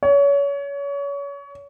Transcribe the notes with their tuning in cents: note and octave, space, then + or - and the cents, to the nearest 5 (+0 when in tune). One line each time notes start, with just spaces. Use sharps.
C#5 +30